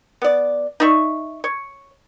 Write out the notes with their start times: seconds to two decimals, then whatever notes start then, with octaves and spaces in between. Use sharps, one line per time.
0.22 B3 D5
0.80 D#4 D5 E5 C#6
1.44 C#5